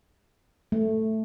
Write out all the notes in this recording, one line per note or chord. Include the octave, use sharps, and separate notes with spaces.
A3